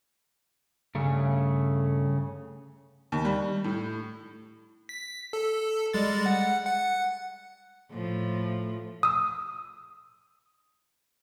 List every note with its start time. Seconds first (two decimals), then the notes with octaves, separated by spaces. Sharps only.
0.95 G2 C#3 A3
3.12 D#2
3.25 G3
3.64 A2
4.89 B6
5.33 A4
5.93 G3 G#3 A6
6.26 F#5
6.66 F#5
7.90 A2 F3
9.03 D#6 E6